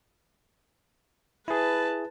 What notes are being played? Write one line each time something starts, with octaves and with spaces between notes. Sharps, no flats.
E4 G#4 B4 A5